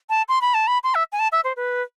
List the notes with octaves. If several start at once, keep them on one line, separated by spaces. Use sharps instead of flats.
A5
C6
B5
A5
B5
C6
E5
G#5
A5
E5
C5
B4